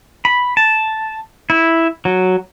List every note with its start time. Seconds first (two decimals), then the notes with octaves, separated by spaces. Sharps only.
0.25 B5
0.57 A5
1.50 E4
2.05 F#3